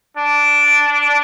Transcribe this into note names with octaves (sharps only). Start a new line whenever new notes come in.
D4